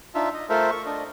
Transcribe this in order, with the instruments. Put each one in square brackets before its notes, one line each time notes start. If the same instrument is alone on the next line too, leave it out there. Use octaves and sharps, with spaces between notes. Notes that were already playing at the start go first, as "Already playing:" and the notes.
[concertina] D4 D#4 F4 E5
D#5
A3 F4 A4 A#4 C5 E5
C#6
D4 D#5